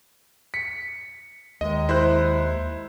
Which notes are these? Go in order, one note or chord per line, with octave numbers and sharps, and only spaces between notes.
B6 C#7
D#2 D#3 G#3 D#5
E4 C5 F#6